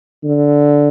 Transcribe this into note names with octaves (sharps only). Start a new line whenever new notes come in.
D3